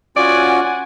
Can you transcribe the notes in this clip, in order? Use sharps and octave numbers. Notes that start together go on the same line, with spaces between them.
C#4 F4 F#4 D5 F#5 G#5